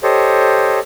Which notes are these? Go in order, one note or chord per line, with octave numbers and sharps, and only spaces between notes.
G4 A4 C5 C#5 D#5